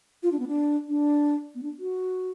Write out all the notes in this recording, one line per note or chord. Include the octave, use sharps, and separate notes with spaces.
F4
D4
B3
D4
D4
B3
D4
F#4